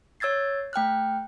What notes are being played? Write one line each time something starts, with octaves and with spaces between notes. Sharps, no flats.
C#5 E6 G#6 A6 C7
A3 G5 F6 F#6